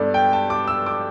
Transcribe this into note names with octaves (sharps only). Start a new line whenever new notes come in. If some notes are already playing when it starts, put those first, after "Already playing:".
Already playing: G2 G3 B3 G4 A4 D5
G5
A5
D6
E6
D6